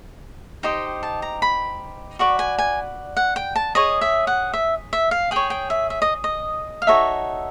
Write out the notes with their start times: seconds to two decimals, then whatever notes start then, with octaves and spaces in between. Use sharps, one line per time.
0.63 D#4 G4 C5 D#5 G5
1.03 A5
1.22 A#5
1.42 B5
2.19 F#4 B4 D5 C#6
2.39 G#5
2.58 G#5
3.17 F#5
3.36 G5
3.56 A5
3.75 G#4 C#5 D#5
4.01 E5
4.27 F#5
4.53 E5
4.93 E5
5.11 F5
5.31 G#4 C#5 G5
5.50 G5
5.70 E5
5.90 E5
6.02 D#5
6.24 D#5
6.82 F5
6.87 D#4 F#4 A4 C#5 E5